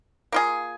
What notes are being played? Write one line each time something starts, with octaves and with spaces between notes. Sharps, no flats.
A#3 F4 G#4